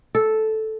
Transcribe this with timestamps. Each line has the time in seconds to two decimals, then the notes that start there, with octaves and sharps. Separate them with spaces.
0.15 A4